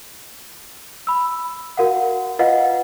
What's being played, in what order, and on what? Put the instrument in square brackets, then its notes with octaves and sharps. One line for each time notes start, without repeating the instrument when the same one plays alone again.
[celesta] B5 E6
F#4 A#4 F5 F#5
F4 B4 D#5 F5 F#5